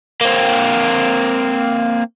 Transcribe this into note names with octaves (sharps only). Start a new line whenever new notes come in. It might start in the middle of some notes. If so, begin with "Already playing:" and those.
A#3 C4